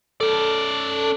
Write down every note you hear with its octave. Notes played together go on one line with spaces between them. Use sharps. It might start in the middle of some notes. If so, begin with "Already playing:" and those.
C#4 A4 D5